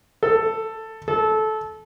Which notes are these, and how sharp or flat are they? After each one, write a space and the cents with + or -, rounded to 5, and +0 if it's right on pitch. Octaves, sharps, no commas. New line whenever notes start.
A4 +10
A4 -20